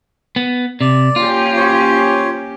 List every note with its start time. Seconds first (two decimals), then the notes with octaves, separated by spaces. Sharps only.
0.36 B3
0.81 C3 D5
1.16 A#3 C#4 F4 G4
1.56 C5 C#5